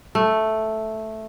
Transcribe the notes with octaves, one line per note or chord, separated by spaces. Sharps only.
A3